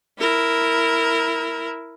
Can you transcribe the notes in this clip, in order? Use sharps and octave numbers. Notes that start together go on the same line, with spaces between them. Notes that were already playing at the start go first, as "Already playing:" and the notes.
E4 A#4